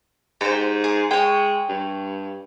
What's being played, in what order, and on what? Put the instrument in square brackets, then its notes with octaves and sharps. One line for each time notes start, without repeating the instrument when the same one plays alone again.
[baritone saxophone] G#2 [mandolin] G4 C5
[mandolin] G#4
[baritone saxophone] G#3 [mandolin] C#5 G5
[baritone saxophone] G2